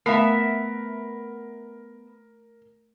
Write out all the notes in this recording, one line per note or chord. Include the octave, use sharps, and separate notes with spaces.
A3 B3 A#4 E5 F5